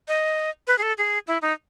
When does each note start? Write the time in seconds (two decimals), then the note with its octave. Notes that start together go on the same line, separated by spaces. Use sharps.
0.08 D#5
0.67 B4
0.78 G#4
0.82 A4
0.98 G#4
1.27 E4
1.42 D#4